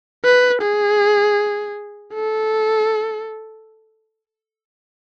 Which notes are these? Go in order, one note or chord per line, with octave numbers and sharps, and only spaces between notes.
B4
G#4
A4